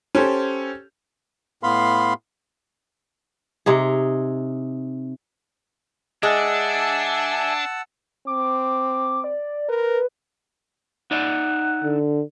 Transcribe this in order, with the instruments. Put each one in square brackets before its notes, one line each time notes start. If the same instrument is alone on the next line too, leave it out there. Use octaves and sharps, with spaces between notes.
[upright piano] C#4 G4 A4 C5
[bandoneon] A2 B3 F5 B5 C6
[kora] C3 D#4 G#4
[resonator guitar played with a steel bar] G#3 [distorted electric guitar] D4 [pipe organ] E5 G#5 [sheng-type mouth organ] F#5 A5 E6
[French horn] C4 [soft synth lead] D6
[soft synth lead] D5
[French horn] A#4 [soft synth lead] B4
[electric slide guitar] D#4 D5 E5 [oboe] F#5
[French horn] D3